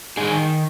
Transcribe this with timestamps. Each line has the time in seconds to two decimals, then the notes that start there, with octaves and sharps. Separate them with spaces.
0.17 D#3 D#4 G#4